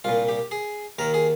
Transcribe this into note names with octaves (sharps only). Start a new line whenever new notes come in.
C2 A#2 F4
G4
G#4
D#2 D#3 A#4
G#4